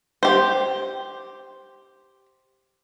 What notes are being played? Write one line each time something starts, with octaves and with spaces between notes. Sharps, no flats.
G4 C5